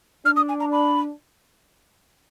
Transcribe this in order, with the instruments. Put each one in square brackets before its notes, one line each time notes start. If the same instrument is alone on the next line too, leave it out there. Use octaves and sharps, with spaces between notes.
[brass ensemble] D4 [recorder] F6
[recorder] D#6
G#5
A#5
B5